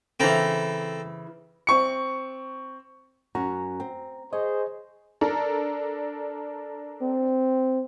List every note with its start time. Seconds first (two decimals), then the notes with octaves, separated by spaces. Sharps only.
0.20 C#3 E3 C4 A4 A#5
1.67 C4 C#6 C#7
3.35 F#2 C#4 F#4 A#5
3.80 C4
4.33 G#4 C5 C#5 D#5
5.21 D4 A4 A#4
7.02 C4